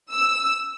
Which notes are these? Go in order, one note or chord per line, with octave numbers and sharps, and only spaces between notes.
E6